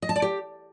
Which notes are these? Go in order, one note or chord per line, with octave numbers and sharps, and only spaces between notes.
D#5
A5
D5
G4